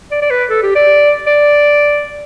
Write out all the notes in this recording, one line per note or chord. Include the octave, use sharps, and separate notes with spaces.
D5
D5
B4
A4
G4
D5
D5